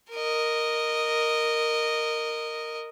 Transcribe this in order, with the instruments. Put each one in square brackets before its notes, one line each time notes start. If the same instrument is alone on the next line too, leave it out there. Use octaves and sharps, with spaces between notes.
[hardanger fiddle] A#4 D#5